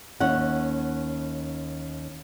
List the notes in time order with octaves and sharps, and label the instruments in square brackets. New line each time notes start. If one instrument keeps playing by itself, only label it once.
[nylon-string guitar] D#2 C#4 F#5